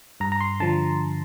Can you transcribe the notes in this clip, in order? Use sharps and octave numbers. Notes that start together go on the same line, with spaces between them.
G2 A#5
A#5
C6
D3 F3 A5